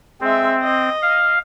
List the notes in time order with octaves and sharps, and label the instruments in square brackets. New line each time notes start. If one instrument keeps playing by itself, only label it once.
[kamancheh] G#3 E5 [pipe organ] C4
[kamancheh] D#5
[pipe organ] F5